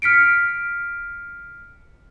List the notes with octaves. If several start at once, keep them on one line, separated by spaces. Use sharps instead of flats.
F6 B6 C#7 D7